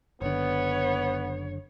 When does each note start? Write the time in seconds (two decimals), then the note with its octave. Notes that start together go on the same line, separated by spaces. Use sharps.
0.22 F#1 D3 B3 C#5